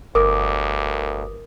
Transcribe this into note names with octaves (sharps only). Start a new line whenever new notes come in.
G1 D2 A#4 D6 D#6